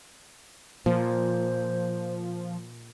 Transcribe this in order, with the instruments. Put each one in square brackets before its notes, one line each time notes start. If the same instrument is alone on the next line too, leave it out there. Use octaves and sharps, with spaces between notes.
[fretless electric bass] A#2 [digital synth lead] F3 [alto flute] C5